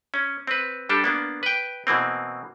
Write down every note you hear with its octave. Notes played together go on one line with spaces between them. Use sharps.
C#4
C4 B4
G3 D4 G4 A4
A#3 B3 D4
B4 G5
B2 E3 A#3 C4